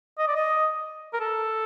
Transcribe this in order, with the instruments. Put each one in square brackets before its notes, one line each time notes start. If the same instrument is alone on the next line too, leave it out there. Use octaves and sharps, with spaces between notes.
[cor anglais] D#5
D5
D#5
A#4
A4